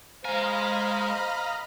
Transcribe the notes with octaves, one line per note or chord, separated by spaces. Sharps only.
G#3 C5 D#5 F5 G#5 A#5 B5